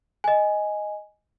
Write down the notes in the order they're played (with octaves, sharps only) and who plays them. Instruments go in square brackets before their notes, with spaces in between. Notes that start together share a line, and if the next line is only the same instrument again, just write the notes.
[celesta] D#5 G#5